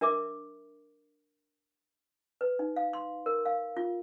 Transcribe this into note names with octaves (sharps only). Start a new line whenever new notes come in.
D4 A#4 E5 D6
B4
D#4
F5
C6
A#4
F5
F4